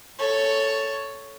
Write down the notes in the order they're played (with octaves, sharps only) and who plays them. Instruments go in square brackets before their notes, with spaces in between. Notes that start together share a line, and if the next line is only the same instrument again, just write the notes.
[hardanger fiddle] A4 C#5